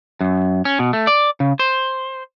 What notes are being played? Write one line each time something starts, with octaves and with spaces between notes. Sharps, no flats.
F#2
C#4
B2
A3
D5
C#3
C5